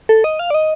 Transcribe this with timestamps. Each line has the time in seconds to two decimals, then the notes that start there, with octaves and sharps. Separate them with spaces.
0.09 A4
0.24 D#5
0.39 F5
0.50 D5
0.54 D#5